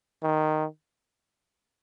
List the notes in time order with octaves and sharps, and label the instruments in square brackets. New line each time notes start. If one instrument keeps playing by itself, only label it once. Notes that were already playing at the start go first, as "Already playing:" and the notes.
[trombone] D#3